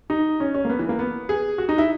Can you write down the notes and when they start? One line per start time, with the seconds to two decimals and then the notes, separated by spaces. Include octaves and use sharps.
0.10 D#4
0.40 C#4
0.55 C#4
0.65 A#3
0.70 B3
0.79 E3
0.89 A#3
0.99 B3
1.29 G#4
1.58 F#4
1.69 D#4
1.78 E4